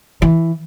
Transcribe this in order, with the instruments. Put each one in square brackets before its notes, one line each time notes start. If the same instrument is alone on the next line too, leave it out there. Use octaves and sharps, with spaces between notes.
[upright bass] E3